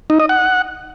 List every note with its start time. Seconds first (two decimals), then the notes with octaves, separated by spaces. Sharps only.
0.10 D#4
0.20 D#5
0.29 F#5